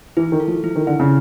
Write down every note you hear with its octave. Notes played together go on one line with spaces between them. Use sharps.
E3 E4
D#3
A4
F3
F3 E4
D#3
D3 E4
C#3